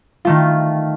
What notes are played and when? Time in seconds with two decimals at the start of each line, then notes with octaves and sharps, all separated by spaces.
0.25 D#3 A3 F4